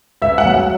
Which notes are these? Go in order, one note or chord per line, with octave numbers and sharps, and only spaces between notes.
C#2 E5
F#5
F#3
F#5